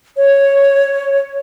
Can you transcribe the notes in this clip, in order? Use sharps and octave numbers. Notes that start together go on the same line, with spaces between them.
C#5